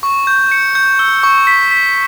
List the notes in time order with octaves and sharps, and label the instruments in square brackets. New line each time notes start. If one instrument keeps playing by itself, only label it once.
[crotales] C#6
G6
C#7
G6
E6
C#6
B6
B6